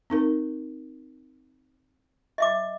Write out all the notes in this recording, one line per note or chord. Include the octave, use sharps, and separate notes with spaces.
C4 D#4 A#4
D#5 E5 D6